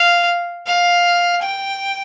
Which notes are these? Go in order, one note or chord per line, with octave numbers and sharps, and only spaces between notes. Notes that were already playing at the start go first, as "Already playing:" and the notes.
Already playing: F5
F5
G5